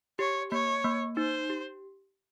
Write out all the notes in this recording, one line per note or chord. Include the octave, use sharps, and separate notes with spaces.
G4 C#5
A#3 C#5
A#3
D#4 C5
G4